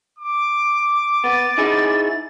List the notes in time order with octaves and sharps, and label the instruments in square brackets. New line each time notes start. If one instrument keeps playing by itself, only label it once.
[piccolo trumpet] D6
[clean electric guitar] B3 [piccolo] A6
[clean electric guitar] D#4 E4 G#4